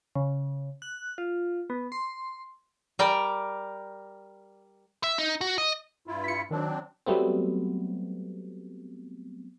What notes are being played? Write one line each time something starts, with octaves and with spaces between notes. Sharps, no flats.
C#3
F#6
F4
B3
C6
G3 A#4 D5 G5
E5
D#4
F#4
D#5
G2 E4 F4
B6 C#7
D#3 F#3 C4 D4
F#3 G3 A3 B3 C4